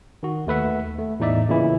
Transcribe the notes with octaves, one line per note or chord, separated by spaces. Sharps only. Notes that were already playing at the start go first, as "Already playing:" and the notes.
D#3 F#4
D#2 A3 B4 E5 F#5
A3
E2 A2 D#4 D5 E5
A#2 C#3 E3 E4